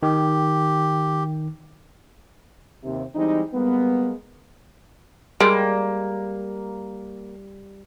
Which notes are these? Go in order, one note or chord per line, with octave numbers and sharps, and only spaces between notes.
D#3 G4
D#2 C3
E3 G3 G#3 C4 D#4
G3 G#3 A#3 B3
G3 G#3 A#3